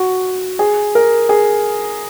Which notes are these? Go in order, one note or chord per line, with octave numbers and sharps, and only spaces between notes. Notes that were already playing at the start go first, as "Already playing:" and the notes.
Already playing: F#4
G#4
A#4
G#4